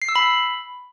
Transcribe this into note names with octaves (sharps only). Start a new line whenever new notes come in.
C7
E6
B5